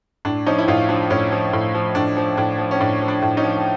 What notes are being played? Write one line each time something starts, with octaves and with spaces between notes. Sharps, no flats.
A2 D4
F3 C#4 D#4
E4
A2 D#4 F4
F3 D4
A2 C#4
F3
A2
F3
A2 D4
F3
A2 D4
F3
C#4
A2 D4
F3
D4
A2
C#4 D#4
F3